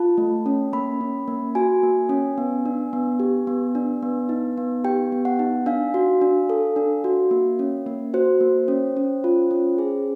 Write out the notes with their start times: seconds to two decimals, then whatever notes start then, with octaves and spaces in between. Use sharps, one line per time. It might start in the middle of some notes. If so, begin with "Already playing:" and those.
Already playing: F4 A5
0.18 A3
0.46 C#4
0.73 A#3 B5
1.01 C#4
1.28 A#3
1.55 F#4 G#5
1.83 A#3
2.09 C#4
2.38 B3
2.65 D4
2.93 B3
3.20 G4
3.47 B3
3.75 D4
4.03 B3
4.29 D#4
4.57 B3
4.85 G4 G5
5.12 B3
5.25 F#5
5.39 D#4
5.66 D4 F5
5.94 F#4
6.21 D4
6.50 A4
6.76 D4
7.04 F#4
7.31 A#3
7.59 C#4
7.86 A#3
8.14 F#4 C5
8.41 A#3
8.68 C#4
8.97 C#4
9.24 F4
9.51 C#4
9.78 G#4